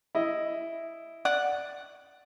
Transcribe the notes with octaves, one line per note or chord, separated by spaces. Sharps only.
E4 D#5
D5 F#5